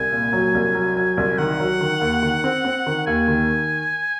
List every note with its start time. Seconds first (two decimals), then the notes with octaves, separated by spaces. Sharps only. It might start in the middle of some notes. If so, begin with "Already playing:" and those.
Already playing: C2 G#5
0.12 A#2
0.33 F#3
0.54 C2
0.75 F#3
0.96 F#3
1.17 C2
1.38 D#3 F#5
1.60 F#3
1.81 D#3
2.01 D#2
2.23 D#3
2.44 C4
2.65 C4
2.86 D#3
3.07 D#2 G#5
3.28 D#3